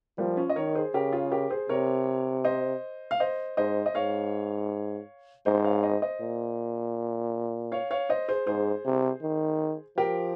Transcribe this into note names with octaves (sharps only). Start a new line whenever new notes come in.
F3 G3 A#3
C#4 F4
D#5
D#3 A#4 C#5
G#4 C5
C#3 G4 A#4
F4 G#4
G4 A#4
G#4 C5
C3 A#4 C#5
C5 D#5
F5
C5 D#5
G#2 C5 D#5
D#5
G#2 C#5 F5
G#2 C5 D#5
C#5 F5
C5 D#5
C5 D#5
A#2
C#5 F5
C#5 F5
C5 D#5
G#4 C5
G#2 G#4 C5
C3
D#3
F3 G4 A#4